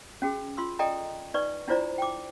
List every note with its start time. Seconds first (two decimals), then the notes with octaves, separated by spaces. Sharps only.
0.22 C#4 F#4 G#4
0.57 F4 C6 E6
0.79 A4 D5 D#5 G5 G#5 A#5
1.34 D#4 B4 D5 C#6
1.68 D4 E4 F4 C5 D5 A#5
1.98 G5 D6